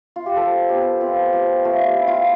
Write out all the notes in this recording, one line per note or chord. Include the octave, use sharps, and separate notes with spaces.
F4
G4
F3 A4
B3 G4
C4 F4
F3 G4
A3 F4
G4
E4
F4